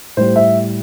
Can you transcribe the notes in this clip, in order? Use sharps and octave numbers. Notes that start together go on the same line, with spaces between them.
A2 G3 C5
E5